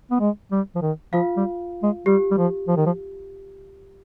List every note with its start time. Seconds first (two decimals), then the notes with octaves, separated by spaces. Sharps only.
0.11 B3
0.20 G#3
0.51 G3
0.75 F3
0.82 D#3
1.13 F3 F4 F5
1.37 G3
1.83 G#3
2.06 G3 G4
2.31 G3
2.37 F3
2.68 F3
2.76 D#3
2.86 F3